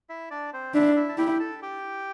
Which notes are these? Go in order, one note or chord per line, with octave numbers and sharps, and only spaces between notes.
E4 E5
D4 D5
C4 C5
D4 E4 E5
E4 E5
A5
E4 G4 G5
A4 A5
G4 G5